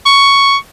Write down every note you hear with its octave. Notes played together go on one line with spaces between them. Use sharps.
C#6